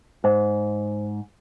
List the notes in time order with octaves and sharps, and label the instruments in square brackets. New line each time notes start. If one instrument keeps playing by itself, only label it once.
[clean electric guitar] G#2 [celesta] C5